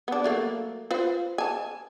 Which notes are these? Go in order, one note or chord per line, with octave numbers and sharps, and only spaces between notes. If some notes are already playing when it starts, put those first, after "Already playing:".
B3 D4
F#3 A3 A#3
F4 B4 C5
G#5 A5